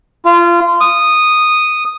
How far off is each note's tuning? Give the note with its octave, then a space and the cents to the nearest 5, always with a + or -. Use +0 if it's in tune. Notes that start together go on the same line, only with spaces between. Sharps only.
F4 -25
D#6 -10